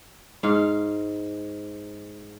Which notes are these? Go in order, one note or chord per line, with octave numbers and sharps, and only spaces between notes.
G#2 F5